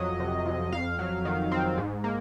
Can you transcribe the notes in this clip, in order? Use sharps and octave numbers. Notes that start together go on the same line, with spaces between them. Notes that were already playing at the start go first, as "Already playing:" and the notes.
Already playing: F2 F#3 D#5
C3
F2
F2 F5
F#3
D#3
C4
G#2
A#3